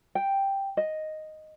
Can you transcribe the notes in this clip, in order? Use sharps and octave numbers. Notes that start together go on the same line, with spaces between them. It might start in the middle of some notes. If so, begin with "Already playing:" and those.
G5
D#5